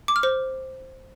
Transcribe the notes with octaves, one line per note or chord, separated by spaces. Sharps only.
D6
F6
C5